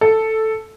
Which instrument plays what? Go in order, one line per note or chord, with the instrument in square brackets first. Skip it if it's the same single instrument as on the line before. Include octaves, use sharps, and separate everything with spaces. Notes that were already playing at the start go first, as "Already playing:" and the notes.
[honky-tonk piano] A4